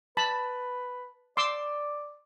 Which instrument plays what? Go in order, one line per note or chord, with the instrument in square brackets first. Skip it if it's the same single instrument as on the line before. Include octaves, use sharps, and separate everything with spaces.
[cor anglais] B4 [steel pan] A5 B5
[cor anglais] D5 [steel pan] C6 D6 E6